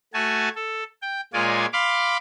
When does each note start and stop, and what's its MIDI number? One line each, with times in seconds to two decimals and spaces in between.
0.14 0.49 57
0.14 0.49 66
0.14 0.49 80
0.14 0.49 81
0.55 0.83 69
1.02 1.21 79
1.33 1.66 46
1.33 1.66 56
1.33 1.66 65
1.33 1.66 73
1.33 1.66 74
1.33 1.66 80
1.73 2.17 77
1.73 2.17 83
1.73 2.17 84
1.73 2.17 86
1.73 2.17 89